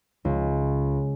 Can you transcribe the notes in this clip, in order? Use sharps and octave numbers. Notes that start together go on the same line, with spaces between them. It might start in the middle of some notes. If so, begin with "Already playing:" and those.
C#2